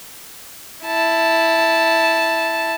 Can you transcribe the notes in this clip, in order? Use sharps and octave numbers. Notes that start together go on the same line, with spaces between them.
E4 A5